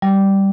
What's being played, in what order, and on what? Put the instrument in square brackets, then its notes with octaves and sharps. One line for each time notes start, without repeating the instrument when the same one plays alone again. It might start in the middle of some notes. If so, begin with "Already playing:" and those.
[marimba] G3